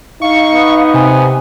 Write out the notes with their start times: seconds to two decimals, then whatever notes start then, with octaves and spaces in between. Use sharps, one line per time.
0.22 D#4 F5 C#6
0.54 B3
0.94 C3 G#5